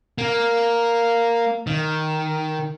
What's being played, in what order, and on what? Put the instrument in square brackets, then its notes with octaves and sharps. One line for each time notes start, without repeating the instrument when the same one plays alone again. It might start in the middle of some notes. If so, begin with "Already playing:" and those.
[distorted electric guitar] A#3
D#3